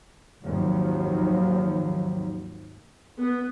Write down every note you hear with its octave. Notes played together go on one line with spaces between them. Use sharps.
G#1 D#2 F3 F#3
B3